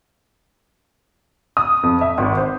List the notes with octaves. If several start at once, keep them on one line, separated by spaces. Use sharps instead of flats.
D#6
F2
E5
G#1
C5